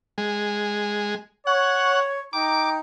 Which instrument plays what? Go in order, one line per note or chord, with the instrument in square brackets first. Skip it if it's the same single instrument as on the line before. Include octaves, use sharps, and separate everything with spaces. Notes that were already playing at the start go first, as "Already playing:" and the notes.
[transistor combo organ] G#3
[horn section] C#5 [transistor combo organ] F#5
[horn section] D#4 G5 A#5 [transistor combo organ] D6